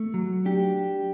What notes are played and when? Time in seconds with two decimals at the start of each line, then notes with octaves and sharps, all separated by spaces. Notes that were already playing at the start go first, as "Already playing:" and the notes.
Already playing: A3
0.14 F#3
0.45 D4 G4